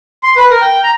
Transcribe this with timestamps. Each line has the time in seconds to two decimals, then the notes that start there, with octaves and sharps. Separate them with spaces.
0.23 C6
0.37 B4
0.50 A#4
0.61 G5
0.83 A#5